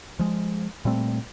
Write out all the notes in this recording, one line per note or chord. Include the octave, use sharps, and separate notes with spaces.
F3 G#3
A#2 G3 A3 C4